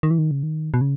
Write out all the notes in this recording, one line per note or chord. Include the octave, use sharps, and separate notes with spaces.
D#3
E3
D#3
C#3
D#3
B2
C#3